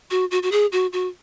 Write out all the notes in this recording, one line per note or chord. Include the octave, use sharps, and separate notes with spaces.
F#4
F#4
F#4
G#4
F#4
F#4